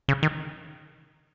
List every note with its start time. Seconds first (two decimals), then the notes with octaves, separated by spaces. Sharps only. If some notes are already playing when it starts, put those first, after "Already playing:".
0.08 C#3
0.23 D#3